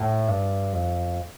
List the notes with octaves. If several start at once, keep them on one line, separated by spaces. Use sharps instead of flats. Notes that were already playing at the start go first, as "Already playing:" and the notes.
Already playing: A2
G2
F2